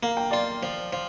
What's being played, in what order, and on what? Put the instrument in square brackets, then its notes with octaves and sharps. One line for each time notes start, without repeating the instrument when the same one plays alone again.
[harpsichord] A#3 [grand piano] F5
[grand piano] G5
[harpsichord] F4 [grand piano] D5 F5
[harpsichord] F3
F3